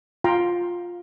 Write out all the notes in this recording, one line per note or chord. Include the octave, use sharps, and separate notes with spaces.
F4 F5 G5 A#5 C6